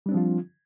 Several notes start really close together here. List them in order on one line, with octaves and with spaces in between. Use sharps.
G3 D4 C4 F3 F4